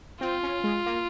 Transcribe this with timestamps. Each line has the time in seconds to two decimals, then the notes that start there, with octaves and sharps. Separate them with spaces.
0.21 C4 F4
0.43 C#4
0.64 G#3
0.86 A#3